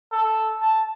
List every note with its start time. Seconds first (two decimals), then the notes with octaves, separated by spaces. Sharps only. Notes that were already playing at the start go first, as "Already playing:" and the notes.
0.12 A4
0.61 A5